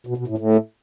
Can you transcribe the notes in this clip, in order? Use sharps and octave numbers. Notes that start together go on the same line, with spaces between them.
B2
B2
A2
A2